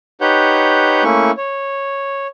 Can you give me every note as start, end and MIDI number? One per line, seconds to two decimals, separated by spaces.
0.21 1.04 63
0.21 1.04 67
0.21 1.04 71
0.21 1.04 73
0.21 1.04 78
0.21 1.04 91
1.04 1.31 57
1.04 1.31 58
1.04 1.31 61
1.04 1.31 64
1.04 1.31 85
1.37 2.27 73